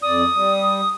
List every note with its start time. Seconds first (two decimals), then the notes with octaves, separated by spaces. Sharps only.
0.02 F2 D5 D#6
0.35 G3